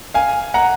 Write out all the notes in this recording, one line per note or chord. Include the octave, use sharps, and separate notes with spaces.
F5 G#5
F#5 A#5